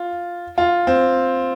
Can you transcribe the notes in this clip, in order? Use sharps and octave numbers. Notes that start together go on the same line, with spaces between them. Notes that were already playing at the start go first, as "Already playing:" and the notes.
Already playing: F4
F4
C4